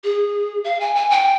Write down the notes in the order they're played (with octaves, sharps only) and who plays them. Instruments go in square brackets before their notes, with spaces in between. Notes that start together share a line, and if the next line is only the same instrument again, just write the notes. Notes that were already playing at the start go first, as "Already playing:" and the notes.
[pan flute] G#4
F5
G#5
G#5
G5